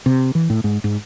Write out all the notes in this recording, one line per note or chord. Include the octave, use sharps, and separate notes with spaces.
C3
E3
A2
G#2
G#2